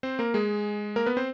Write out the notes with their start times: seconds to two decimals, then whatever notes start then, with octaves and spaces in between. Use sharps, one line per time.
0.03 C4 C5
0.19 A#3 A#4
0.34 G#3 G#4
0.96 A#3 A#4
1.06 B3 B4
1.17 C4 C5